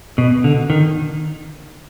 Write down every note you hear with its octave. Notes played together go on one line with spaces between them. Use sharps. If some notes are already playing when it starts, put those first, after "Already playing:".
B2
D3
D#3